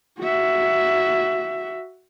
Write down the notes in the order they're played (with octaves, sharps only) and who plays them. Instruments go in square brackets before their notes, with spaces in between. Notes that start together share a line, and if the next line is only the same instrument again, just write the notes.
[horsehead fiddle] F#4 E5